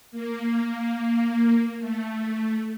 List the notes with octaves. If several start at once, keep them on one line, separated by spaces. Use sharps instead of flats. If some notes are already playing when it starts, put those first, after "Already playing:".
A#3
A3